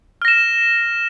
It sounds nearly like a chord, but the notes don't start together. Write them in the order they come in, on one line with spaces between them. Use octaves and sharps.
F6 A#6 E7